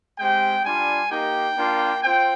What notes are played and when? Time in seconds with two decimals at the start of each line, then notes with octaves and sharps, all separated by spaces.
0.19 G#3 C4 G4 G5
0.65 G3 D4 F4 G#5
1.10 A#3 D#4 G4 G5
1.57 A#3 D4 F4
2.03 C4 F4 G5